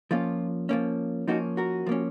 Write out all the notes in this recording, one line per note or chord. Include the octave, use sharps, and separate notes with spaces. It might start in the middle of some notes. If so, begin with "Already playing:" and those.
F3 A#3 C#4 F4
F3 A#3 C#4
F3 A#3 C#4 D#4 F#4
F#4 A#4
F3 A#3 C#4